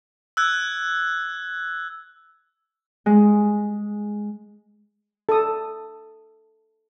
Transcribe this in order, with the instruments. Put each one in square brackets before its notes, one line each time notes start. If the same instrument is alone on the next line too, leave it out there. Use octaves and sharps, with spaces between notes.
[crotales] E6 F#6 G#6
[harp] G#3
[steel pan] A4 D#6